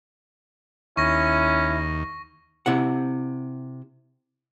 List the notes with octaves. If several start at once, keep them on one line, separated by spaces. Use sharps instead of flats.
D#2 C#4 E4 C#6 A#6
C3 E4 F#5